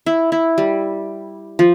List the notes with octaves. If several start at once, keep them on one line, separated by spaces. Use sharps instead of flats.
E4
E4
G3
F3